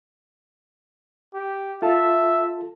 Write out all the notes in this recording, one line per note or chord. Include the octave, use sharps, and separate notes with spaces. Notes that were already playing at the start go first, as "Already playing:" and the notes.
G4
F4 A4 E5 A5